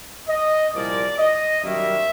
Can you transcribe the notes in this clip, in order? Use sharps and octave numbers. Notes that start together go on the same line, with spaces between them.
D#5
C2 A#2 F3 A#3 D5
D#5
F#2 D#3 G3 A#3 E5